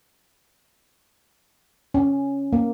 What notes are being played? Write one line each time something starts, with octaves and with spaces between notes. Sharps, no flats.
C#4
A#3